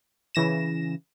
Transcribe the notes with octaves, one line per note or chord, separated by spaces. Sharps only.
C#3 E3 A#6 E7